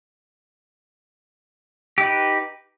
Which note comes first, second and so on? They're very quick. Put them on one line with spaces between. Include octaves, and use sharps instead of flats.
G4 D#4 B4